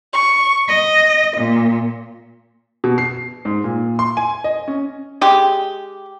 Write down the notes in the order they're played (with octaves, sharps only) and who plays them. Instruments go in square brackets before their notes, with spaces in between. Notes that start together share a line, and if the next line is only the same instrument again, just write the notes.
[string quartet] C#6
D#5
A#2
[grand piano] B2
C7
G#2
A#2
C6
G#5
D#5
C#4
[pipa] G#3 G4